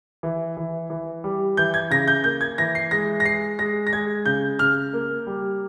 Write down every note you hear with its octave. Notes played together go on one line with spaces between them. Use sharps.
E3
E3
E3
G3
E3 G6
G#6
C#3 A#6
G6
A#3 G6
G#6
E3 A#6
C7
G#3 A#6
A#6
G#3 C7
G#3 A#6
A#6
G#3 G#6
C#3 G6
C#3 F6
A#3
G3